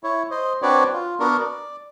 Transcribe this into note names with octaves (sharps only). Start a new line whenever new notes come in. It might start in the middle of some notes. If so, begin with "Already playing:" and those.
E4 C#5
C5 D#5
C4 D4 F#4 B4 C#5 D5
F4
B3 D4 F#4 A#4
D5